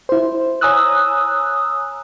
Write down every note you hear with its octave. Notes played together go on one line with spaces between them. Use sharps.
E4 C5
C#5 G#5 A#5 D#6 E6 F#6